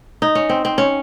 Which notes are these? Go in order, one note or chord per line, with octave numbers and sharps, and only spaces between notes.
D#4
C#4
C4
C4
C#4